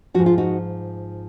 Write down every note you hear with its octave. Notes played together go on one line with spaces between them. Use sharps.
G#2 F3 F#4
F4
D#4 F#4